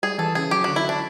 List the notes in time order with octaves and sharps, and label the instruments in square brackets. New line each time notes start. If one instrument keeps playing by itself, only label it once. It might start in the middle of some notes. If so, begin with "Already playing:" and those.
[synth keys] G3 [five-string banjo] G#4
[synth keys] E3 [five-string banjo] A4
[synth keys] C#3 [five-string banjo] G#4
[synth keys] F#3 [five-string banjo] G4
[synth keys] D3 [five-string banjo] F#4
[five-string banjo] E4
D4